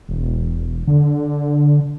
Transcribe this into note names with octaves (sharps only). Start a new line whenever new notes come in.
E1
D3